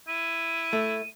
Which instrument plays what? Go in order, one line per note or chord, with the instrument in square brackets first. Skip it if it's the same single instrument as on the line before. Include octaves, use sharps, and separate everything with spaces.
[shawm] E4 [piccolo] D#7
[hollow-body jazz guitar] A3